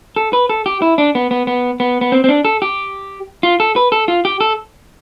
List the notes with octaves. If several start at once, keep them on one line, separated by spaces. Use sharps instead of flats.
A4
B4
A4
G4
E4
D4
B3
B3
B3
B3
B3
C4
C4
D4
A4
G4
F4
A4
B4
A4
F4
G4
A4